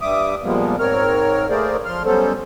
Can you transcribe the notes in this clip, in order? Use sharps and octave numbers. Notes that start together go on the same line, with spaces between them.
G2 G3 E5 D6 D#6
A#2 F3 G3 G#3 A#3 B3
G#2 C4 A#4 C#5 F6
A3 A#3 G#4 A#4 C5 D5
F3 C6 F6
F#3 G3 B3 C#4 A4 C5